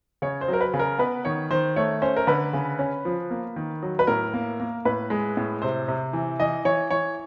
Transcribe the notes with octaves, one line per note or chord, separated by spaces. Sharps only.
C#3 C#5
C5
F#3 A#4
B4
C#3
A#4
B3 B4
D#3 C#5
D#3 C5
A3 C#5
C#4 C5
A#4
D3 B4
C#3
C#4
F3
A#3
D#3
F#3
B4
A2 A#4
A#3
A#3
A2 B4
G#3
A2
C3 C5
C3
E3
E3 D#5
E3 C#5
E3 C#5